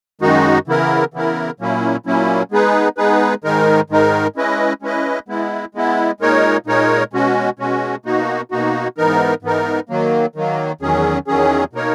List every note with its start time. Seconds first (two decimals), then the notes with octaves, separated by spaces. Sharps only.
0.21 F#2 D#3 G#3 D#4 F#4
0.67 C#3 E3 B3 E4 A#4
1.14 C#3 E3 B3 E4 A#4
1.60 A#2 F#3 A#3 C#4 E4
2.06 A#2 F#3 A#3 C#4 E4
2.51 G#3 B3 D#4 G#4 B4
2.97 G#3 B3 D#4 G#4 B4
3.44 G#2 D#3 G#3 D#4 A#4
3.90 G#2 D#3 G#3 D#4 A#4
4.36 G#3 C#4 E4 B4 D#5
4.82 G#3 C#4 E4 B4 D#5
5.28 G#3 B3 E4
5.75 G#3 B3 E4
6.20 A#2 G#3 D#4 A#4 C#5
6.66 A#2 G#3 D#4 A#4 C#5
7.13 B2 G#3 C#4 F#4
7.59 B2 G#3 C#4 F#4
8.05 B2 A#3 D#4 F#4
8.51 B2 A#3 D#4 F#4
8.98 G#2 E3 B3 D#4 A#4
9.42 G#2 E3 B3 D#4 A#4
9.89 D#3 F#3 A#3
10.36 D#3 F#3 A#3
10.81 E2 D#3 F#3 C#4 G#4
11.27 E2 D#3 F#3 C#4 G#4
11.73 B2 A#3 D#4 A#4 C#5